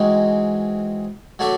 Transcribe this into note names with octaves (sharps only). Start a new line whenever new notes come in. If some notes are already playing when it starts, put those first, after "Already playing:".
Already playing: E3 G#3 C4 D#4 F#4
F#3 A3 D4 F#4